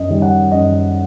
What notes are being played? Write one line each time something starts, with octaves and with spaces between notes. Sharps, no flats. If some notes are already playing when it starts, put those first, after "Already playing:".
Already playing: F#2 D#5
D#3 G3
F#5
F#2 D#5